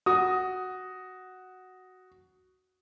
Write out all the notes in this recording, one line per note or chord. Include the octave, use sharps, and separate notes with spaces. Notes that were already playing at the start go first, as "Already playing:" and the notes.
F#4 D#6